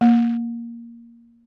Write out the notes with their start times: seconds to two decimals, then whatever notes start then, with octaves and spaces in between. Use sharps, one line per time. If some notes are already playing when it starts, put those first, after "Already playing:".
0.01 A#3